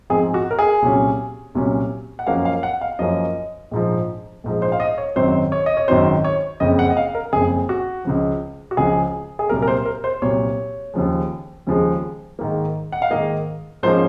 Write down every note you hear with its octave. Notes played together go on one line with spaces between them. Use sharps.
G#2 F3 C4 G#4
F#4
A#4
G#4
C2 A#2 F#3 C#4
C2 A#2 F#3 C#4
F#5
F#2 F3 A#3 C#4 F5
F5
F#5
F5
F#2 F3 A#3 C#4 D#5
A#1 G#2 F3
A#1 G#2 F3
C5
F5
D#5
C#5
G#1 F#2 D#3 F#3 C4 C5
C#5
D#5
C#5
G#1 F#2 D#3 F#3 C4 C5
C#5
F#1 F2 C#3 D#5
F#5
D#5
F5
A#4
F#1 F2 C#3 G#4
F#4
C#2 C#3 F3
F#4
C#2 C#3 F3 G#4
G#4
C2 A#2 F#3 A#4
A#4
C5
A#4
C5
C2 A#2 F#3 C#5
D#2 C#3 F3 G#3
D#2 C#3 F3 G#3
G#2 D#3 A#3
F#5
F5
G#2 D#3 A#3 D#5
G#2 F3 A#3 C#4 C5